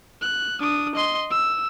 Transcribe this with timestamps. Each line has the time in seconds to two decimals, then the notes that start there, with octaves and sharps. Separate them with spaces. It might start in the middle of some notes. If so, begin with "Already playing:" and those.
0.21 F#6
0.60 D4 D#6
0.95 D#5 C6
1.31 E6